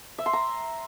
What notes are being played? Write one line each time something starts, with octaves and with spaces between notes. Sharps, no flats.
E5
C6
A#5